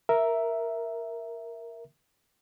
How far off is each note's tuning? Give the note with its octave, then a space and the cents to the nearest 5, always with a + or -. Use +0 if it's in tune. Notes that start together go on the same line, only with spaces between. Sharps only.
A#4 +0 E5 +0